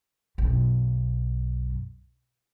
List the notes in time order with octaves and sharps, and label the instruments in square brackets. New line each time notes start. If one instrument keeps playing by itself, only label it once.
[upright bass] B1 F#2